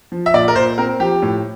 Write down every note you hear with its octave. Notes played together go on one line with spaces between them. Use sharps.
F3
E5
A#2 D5
A#4
A#2 C5
C4 A#4
F3 G4
A2